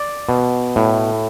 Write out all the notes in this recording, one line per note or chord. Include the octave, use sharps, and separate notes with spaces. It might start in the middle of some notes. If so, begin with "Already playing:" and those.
Already playing: D5
B2
A2